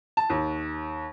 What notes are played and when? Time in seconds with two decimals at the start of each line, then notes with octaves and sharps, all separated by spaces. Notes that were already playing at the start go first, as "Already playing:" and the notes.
0.17 A5
0.30 D#2